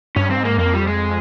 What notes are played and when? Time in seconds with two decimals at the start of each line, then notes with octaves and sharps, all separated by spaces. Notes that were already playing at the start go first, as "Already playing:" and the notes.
0.16 G2 C#4
0.30 C4
0.37 G#2
0.45 A#3
0.58 F2 A#3
0.74 G3
0.88 G#3